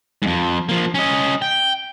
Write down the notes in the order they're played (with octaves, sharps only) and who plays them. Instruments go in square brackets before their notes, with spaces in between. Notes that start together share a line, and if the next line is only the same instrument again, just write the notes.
[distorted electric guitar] F2 G#2
F3 A#3
C#4 D#5
G5